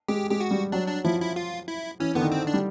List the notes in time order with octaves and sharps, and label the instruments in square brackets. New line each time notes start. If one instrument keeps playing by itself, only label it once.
[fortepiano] G#3 [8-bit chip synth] G4
[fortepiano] G#3 [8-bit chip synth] G4
[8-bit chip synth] F#4
[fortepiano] G3
[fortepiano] F#3 [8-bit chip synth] D4
[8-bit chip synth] D4
[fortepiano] F3 [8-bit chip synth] E4
[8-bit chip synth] E4
F4
E4
[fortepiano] E3 [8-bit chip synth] C#4
[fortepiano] D3 [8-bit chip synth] B3
[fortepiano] D#3
[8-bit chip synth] C4
D4
[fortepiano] G3